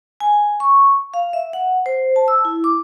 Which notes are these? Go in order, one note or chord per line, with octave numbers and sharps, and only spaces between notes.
G#5
C#6
F5
E5
F#5
C5
A5
E6
E4
D6